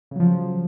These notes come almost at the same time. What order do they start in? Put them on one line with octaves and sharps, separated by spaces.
C#3 F#3 F3